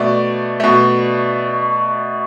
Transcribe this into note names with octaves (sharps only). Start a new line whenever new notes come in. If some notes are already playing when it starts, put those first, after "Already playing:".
Already playing: B2 A3 D5
B2 A3